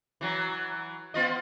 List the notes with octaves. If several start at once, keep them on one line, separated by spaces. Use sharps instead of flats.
E3 F#3
B3 F4 D#5